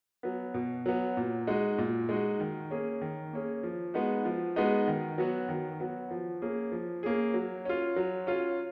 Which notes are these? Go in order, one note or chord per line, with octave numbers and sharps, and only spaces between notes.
F#3 B3
B2
F#3 B3
A#2
G#3 D#4 F#4
A#2
G#3 D#4 F#4
D#3
A#3 C#4 G#4
D#3
A#3 C#4 G#4
F3
G#3 B3 D#4 F#4
F3
G#3 B3 D#4 F#4
D#3
F#3 B3 F#4
D#3
F#3 B3 F#4
F3
A#3 C#4 G#4
F3
A#3 C#4 G#4
F#3
C#4 F4
F#3
C#4 F4